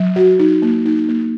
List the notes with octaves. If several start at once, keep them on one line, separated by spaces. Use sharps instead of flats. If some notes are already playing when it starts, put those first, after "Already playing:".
Already playing: F#3
F#4
D#4
A#3
D#4
A#3